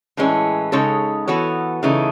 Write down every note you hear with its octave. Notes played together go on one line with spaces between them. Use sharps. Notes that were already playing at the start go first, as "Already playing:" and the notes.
A2 E3 G#3 C#4
C#3 G#3 D#4 A4 C#5
E3 B3 F#4 A4 C#5
C#3 E3 A3 D#4